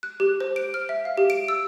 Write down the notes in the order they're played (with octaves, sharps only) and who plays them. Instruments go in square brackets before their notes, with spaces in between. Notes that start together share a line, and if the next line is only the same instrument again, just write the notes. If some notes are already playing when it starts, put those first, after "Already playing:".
[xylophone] F#6
G4
C5
D7
F6
E5
F5
G4
D7
E6